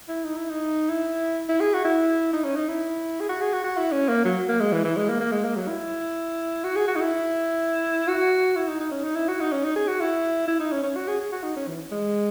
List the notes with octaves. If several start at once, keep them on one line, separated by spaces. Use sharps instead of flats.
E4
D#4
E4
D#4
E4
E4
G#4
F#4
E4
D#4
C#4
D#4
E4
G#4
F#4
G#4
F#4
F#4
E4
C#4
A#3
F#3
A#3
G#3
E3
E3
G#3
A#3
A#3
G#3
A#3
F#3
E4
F#4
G#4
F#4
D#4
E4
F#4
E4
D#4
D#4
C#4
D#4
E4
F#4
D#4
C#4
D#4
G#4
F#4
E4
E4
D#4
C#4
C#4
F#4
G#4
G#4
F#4
D#4
C#4
E3
G#3